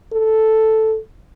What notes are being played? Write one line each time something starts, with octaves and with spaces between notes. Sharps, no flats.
A4